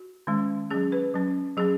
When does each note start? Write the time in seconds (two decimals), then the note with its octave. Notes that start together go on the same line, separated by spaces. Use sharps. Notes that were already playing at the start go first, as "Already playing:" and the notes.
Already playing: F#4
0.27 D#3 G#3 C#4
0.71 F#3 C#4 G#4
0.92 B4
1.14 F#3 C#4
1.57 F#3 C#4 G#4